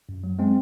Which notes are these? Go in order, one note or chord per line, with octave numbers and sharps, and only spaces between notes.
F#2
F#3
G#3 C4